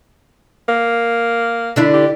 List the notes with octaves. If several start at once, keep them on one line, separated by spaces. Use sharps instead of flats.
A#3
D3 D4 E4
G4